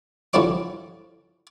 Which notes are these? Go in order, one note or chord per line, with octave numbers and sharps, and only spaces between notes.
D3 F3 C#4 E4 D5 D6